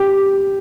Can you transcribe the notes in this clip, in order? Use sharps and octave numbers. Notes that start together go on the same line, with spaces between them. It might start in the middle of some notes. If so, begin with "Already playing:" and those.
Already playing: G4